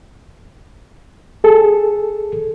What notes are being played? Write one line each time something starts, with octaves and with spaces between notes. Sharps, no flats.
G#4 A4